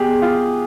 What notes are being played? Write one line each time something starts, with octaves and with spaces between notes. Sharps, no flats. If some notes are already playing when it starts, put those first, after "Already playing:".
Already playing: B2 G4 G#4
F4